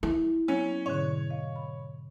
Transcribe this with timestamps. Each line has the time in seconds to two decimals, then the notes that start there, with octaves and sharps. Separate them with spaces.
0.03 E4
0.48 F#3 A#3 B3 C#4
0.86 G#2 B2 D3 C#5
1.30 D#5 F5
1.56 B5